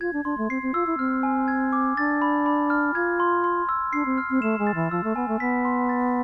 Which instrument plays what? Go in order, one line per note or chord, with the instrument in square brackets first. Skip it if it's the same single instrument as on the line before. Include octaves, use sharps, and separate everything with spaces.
[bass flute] F4 [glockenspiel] G#6
[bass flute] D4
[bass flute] D4 [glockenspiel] C6
[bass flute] A3
[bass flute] C4 [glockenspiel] C7
[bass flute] C4
[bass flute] F4 [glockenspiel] E6
[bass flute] E4
[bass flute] C4 [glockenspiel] F6
[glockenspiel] G#5
G#6
D6
[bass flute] D4 [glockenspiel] A6
[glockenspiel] B5
B5
F6
[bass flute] F4 [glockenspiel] G#6
[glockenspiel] C6
C6
E6
[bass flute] D4 [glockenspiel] C7
[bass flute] C4
[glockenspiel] F6
[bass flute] C4
[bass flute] A3 [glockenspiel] E7
[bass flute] G#3
[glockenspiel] A6
[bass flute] E3
[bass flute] F3 [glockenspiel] E6
[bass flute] A3
[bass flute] B3 [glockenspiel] G#5
[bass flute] A3
[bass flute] B3 [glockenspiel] B6
[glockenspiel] C6
A6